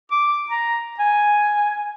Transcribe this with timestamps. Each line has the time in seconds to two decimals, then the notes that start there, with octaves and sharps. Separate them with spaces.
0.11 D6
0.50 A#5
0.99 G#5